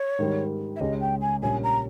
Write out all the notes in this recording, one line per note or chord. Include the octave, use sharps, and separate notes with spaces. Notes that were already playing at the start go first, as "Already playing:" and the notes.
Already playing: C#5
G#2 D#3 G3
E5
C#2 C#3 G#3 C#4 G4 D#5
G5
G#5
A#1 A#2 G3 C#4 G#5
A#5